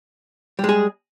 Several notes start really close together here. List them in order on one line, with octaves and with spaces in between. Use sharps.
G3 G#3 G#4